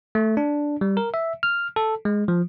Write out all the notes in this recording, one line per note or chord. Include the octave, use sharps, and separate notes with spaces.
A3
D4
G3
A#4
E5
F6
A4
G#3
F3